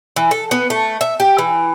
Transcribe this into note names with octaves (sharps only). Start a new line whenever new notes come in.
E3
A4
B3
A3
E5
G4
E3